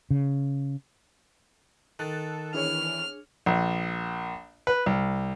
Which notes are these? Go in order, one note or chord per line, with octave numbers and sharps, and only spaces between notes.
C#3
D#3 A4 F#6 A6
E3 D4 G#4 C#5 F6
A#1
B4
C2